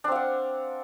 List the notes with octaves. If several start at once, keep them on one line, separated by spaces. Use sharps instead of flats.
C4 D4 F5 F#5